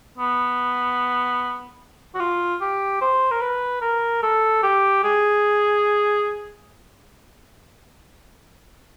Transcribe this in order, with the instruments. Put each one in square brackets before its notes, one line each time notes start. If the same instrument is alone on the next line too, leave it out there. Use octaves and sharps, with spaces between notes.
[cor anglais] B3
F#4
F4
G4
C5
A#4
B4
A#4
A4
G4
G#4